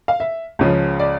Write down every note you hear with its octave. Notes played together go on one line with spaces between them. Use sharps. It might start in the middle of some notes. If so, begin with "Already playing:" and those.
F5
E5
C#2 C#3 F3
D5